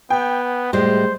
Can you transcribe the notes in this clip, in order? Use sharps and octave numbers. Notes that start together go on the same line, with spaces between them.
B3 G5
A2 G3 G#3 C5